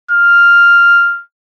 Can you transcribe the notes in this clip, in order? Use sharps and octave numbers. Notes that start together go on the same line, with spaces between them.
F6